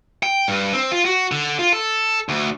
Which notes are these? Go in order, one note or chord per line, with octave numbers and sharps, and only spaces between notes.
G5
G2
C4
F4
F#4
D3
F4
A4
D2